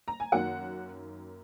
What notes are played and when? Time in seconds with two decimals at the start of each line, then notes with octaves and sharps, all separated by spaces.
0.08 A#5
0.20 G#5
0.32 F#2 D#3 A#3 F#4 F#5